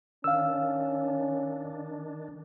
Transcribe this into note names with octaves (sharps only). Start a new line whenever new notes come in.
D#3 C#4 D4 F5 E6